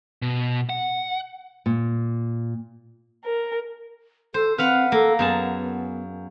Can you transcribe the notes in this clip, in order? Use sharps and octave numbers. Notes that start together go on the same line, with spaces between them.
B2
F#5
A#2
A#4
A4 C5
C4 B4 F5 F#5
A#3 A4
F#2 B3 G#4 A5